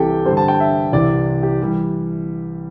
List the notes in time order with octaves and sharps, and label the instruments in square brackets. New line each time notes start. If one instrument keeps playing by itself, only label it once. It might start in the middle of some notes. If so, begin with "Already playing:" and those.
Already playing: [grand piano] C2 C3 E3 G4 A4 G5
G2 D3 G3 C5
A5
G5
E5
C2 C3 E3 D5
G4
E3 G3